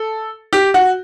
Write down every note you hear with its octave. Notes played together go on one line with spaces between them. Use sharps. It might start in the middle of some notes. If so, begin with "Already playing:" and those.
Already playing: A4
G4
F#4